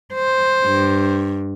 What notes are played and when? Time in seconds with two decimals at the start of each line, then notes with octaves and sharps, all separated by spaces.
0.14 C5
0.65 G2